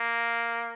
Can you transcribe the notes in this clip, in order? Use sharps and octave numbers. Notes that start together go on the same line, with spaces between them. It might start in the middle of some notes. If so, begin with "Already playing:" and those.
Already playing: A#3